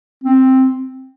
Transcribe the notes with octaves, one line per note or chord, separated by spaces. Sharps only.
C4